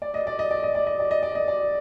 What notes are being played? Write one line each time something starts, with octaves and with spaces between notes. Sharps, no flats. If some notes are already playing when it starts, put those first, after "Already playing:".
D5
D#5
D5
D#5
D5
D#5
D5
D#5
D5
D#5
D5
D#5
D5